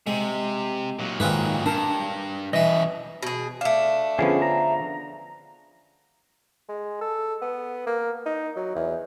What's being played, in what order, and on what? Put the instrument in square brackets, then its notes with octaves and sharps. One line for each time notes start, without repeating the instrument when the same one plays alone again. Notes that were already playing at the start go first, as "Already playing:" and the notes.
[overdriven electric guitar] C3 [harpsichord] G#3
[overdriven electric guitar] A#2 F#3
[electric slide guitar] G#2 D#3 [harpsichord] F4 G#4 B4
[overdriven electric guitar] G2 [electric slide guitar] D4 A5 A#5 [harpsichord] A#4
[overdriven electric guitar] F#2 B2 [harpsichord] E3 E5 [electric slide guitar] D#5
[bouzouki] B2 G#4
[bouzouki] A3 D4 [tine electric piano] F5
[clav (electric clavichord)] D3 F3 B3 [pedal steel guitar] C#4 G#4
[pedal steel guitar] A#5
[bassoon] G#3
A4
B3
A#3
D#4
F#3
E2